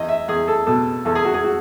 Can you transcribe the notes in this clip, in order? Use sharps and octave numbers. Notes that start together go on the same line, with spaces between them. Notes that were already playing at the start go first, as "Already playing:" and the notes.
Already playing: E2 D#5
E5
E2 G#4
A4
B2 A4
E2 A4
G#4
F#4
G#4
F#4